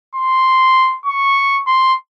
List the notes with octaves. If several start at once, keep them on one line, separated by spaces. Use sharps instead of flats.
C6
C#6
C6